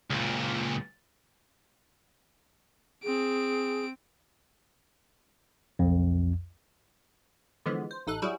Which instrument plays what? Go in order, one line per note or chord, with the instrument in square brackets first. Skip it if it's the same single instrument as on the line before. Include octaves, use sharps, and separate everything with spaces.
[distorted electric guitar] C#2 A#2
[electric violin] C4 D7 [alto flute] G#4
[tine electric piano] B1 F2
[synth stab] D3 E3 F3 G#3 B3
C5
A1 D#4 A4 F#6
F#3 G3 E4 F#4 G#4